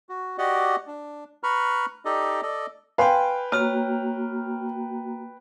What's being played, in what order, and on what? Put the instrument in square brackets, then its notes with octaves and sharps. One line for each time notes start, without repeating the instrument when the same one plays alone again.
[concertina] F#4
F#4 G4 D5 D#5 F#5
D4
B4 A#5 B5 C#6 F6
D#4 G4 A4 D5 D#5
A4 D5 D#5
[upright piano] B4 G5 [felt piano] F5 G#5 C6
[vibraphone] A#3 F#4 A#5 [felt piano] C#5 F6